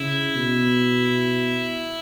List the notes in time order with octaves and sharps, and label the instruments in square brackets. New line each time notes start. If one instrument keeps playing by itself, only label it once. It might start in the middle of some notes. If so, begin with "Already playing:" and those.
Already playing: [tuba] C#3 [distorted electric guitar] E4
[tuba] B2